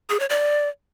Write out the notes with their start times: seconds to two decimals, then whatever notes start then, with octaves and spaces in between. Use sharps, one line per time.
0.10 G#4
0.20 C#5
0.30 D5